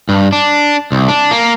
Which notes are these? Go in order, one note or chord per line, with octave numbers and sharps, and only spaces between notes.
G2
D4
C2
D4
A#3